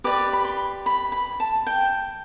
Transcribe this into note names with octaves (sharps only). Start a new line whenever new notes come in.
G4 B4 D5 D6
B5
C6
B5
B5
A5
G5